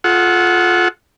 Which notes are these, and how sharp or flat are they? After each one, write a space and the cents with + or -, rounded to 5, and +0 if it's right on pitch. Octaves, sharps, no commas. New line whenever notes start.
F4 +10 A4 -35 F#5 +0